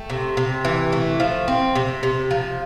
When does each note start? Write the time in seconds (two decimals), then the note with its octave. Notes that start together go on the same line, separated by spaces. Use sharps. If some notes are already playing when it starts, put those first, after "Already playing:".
Already playing: A3 G5
0.10 C3
0.37 C3
0.65 E3
0.92 A3
1.20 F3
1.48 C4
1.75 C3
2.03 C3
2.31 F3